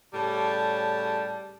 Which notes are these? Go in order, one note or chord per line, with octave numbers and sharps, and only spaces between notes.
A2 C#3 G3 A5